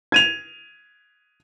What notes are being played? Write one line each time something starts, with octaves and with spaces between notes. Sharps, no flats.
G#6 D#7 F7